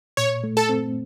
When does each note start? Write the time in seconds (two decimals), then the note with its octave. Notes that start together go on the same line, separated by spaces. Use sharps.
0.17 A#2 C#5
0.44 A3
0.57 A4
0.69 C4